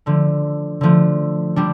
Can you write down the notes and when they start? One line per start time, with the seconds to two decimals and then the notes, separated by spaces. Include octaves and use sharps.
0.06 D3 F3 A3
0.81 D3 F3 A3
1.56 D3 G3 D4